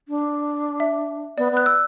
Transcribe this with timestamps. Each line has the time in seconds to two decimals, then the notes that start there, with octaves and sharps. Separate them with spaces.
0.08 D4
0.80 E5
1.38 B3 D5
1.52 B3 F#6
1.66 E6